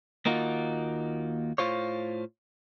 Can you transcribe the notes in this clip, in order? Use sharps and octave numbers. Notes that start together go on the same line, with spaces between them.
D#2 A#3 D#4 F4 F#4
A2 F4 C5 C#5